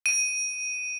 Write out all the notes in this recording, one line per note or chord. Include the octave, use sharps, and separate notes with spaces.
D#7